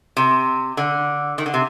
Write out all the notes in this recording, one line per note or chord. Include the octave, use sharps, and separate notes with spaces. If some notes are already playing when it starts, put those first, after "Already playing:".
C3
D3
D#3
D3
C3